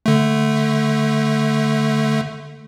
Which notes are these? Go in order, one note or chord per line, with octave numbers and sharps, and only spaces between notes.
D3 A3